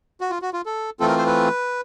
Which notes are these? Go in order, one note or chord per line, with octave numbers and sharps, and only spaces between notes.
F#4
F4
F#4
F4
A4
E3 A3 C4 F4 A4
A#4
C5
B4